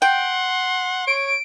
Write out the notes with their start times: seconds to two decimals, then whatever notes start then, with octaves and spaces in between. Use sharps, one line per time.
0.02 F#5 G5 C6
1.07 C#5 D7